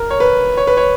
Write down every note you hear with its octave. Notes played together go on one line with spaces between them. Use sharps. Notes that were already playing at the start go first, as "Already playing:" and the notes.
Already playing: A#4
C#5
B4
C#5
B4
C#5